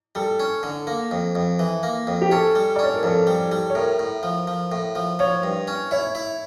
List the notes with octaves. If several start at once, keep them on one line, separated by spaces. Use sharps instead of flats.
G3 A4
C#4
D3
A#3
F2
F2
E3
A#3
F2
G4
C#4 A4
G3
C#4 D5
C#5
A#4
F2 A4
G3
G3
C#5
A2 A#4
A2
F3
F3
A2
F3
F3 C#5
G2
C#4
E4 C#5
E4